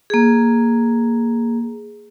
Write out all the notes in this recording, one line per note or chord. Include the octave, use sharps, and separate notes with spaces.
A#3 G#4